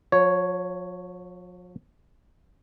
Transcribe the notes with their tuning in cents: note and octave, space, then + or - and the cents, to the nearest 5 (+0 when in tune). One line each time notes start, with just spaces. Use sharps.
F3 +40 C#5 +0